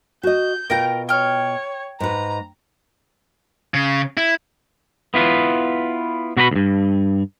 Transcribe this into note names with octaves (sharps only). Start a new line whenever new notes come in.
F#4 D#5 G6
B2 F4 A#4 G5 A#5
C#5 G5 F6
G#2 B4 A#5
C#3
E4
B3 E4 F4 B4
B2 F#4 B4 D5 B5
D2 G2